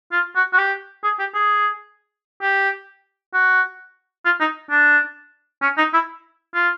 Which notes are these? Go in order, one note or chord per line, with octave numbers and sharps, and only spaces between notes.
F4
F#4
F#4
G4
G#4
G4
G#4
G4
F#4
F4
D#4
D4
C#4
D#4
E4
F4